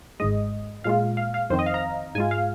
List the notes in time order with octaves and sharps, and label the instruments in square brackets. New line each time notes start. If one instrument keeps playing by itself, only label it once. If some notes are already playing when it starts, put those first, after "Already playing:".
[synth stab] G#1 G#2 G#3 D#5
A#2 G#3 F4 F5
F5
F5
F2 D#3 C4 C5
D#5
F5
A#5
G#2 G#3 F4 G#5
F5